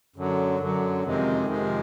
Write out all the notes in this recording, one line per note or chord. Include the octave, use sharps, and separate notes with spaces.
F#2 D3 F#3
F#2 D3 F#3
F2 C3 D#3 G#3
F2 C3 D#3 G#3